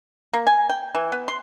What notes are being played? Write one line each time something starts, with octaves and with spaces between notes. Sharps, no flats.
A#3
G#5
G5
E3
B3
C6